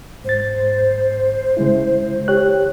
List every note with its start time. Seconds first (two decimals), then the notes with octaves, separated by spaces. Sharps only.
0.25 G#2 C5 A6
1.57 C#3 G#3 E4
2.28 G4 C#5 F#6